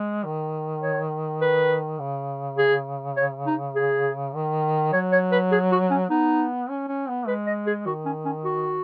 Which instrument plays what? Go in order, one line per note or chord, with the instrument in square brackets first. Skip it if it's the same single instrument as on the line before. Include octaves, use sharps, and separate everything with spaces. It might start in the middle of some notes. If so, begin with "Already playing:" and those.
Already playing: [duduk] G#3
D#3
[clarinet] C#5
B4
[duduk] C#3
[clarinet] G#4
C#5
D#4
G#4
[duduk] D#3
[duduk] F#3 [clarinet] C#5
[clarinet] C#5
B4
G#4
F#4
C#4
[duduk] B3 [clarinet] D#4
[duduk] C#4
C#4
B3
[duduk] G#3 [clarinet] B4
[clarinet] D#5
G#4
[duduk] D#3 [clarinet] F#4
[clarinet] C#4
C#4
F#4